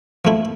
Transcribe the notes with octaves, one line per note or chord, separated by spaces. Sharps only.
F3 A3 E4